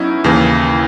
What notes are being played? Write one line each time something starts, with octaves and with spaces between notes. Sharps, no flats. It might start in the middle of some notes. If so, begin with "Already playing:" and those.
Already playing: F#3 B3 C#4 D#4 E4
D#2 C#3 E3